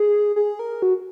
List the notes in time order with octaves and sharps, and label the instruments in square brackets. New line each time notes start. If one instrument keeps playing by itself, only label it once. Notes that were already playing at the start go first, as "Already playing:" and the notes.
Already playing: [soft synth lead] G#4
G#4
A#4
F#4